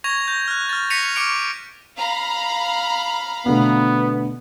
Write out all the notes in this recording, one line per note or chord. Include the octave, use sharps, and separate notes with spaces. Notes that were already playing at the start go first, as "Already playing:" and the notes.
C#6 G#6 A#6 F7
G6 A#6
F6 F#6
F6 A6
A#6 B6 C#7 D#7 F7
C#6 D6 F6 C#7 D7 F7
F5 A#5 B5
B2 D3 A3 B3